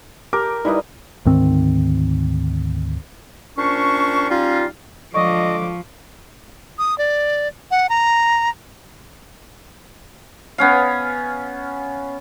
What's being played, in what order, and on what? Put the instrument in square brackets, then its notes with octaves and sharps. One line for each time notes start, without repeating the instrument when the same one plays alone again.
[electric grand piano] G4 D6 [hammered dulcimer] A#4
[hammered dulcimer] G3 D#5 [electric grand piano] D#4 E4 B4
[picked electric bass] D2 G#2 D#3 C4
[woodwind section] A#2 C#4 D4 C5 C#6
G3 C#4 D#4 F4
[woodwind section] D3 G#3 D6 [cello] F3 [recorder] D#5 [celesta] C#6
[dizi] D#6
D5
F#5
A#5
[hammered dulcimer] B3 C#4 F5